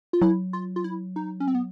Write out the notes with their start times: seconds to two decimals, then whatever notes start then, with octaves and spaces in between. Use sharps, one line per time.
0.13 F4
0.22 F#3 E4
0.53 F4
0.76 F4
0.84 E4
1.16 D#4
1.40 C#4
1.47 C4
1.55 B3